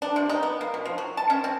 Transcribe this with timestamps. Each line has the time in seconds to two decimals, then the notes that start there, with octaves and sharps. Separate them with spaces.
0.02 D4
0.16 C3
0.29 D#4
0.43 B3
0.61 A#3
0.74 B2
0.85 F3
0.98 F#3
1.17 A5
1.30 C#4
1.44 C4